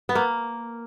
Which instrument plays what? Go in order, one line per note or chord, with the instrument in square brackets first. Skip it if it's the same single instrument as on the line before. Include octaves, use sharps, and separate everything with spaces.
[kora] B3
A#3